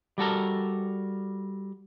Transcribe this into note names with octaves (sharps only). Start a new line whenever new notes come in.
G3 F#4 A4 A#4